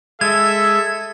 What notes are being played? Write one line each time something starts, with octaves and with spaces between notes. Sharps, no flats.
G#3 A4 E5 G#6